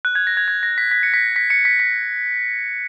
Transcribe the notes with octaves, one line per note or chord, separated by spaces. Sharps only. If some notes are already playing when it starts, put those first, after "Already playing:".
F#6
G#6
A#6
G#6
G#6
A#6
B6
B6
C#7
B6
B6
C#7
B6
B6